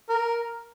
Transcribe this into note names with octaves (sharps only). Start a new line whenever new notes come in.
A#4